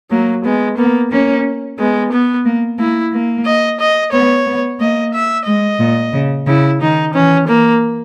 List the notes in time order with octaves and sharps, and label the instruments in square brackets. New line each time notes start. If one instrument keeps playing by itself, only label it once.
[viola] F#3 [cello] A#3
[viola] G#3 [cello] B3
[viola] A#3 [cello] B3
[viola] A#3 [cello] C#4
[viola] G#3 [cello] B3
[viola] B3
[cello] A#3
[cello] A#3 [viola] E4
[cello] A#3
[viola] D#5
D#5
[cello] B3 [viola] C#5
[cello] B3
[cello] A#3 [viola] D#5
[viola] E5
[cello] G#3 [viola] D#5
[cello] A#2
C#3
[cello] C#3 [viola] E4
[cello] D#3 [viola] D#4
[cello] E3 [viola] C#4
[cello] E3 [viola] A#3